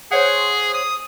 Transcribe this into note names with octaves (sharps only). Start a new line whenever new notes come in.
G#4 C5 C#5 F#5
D#6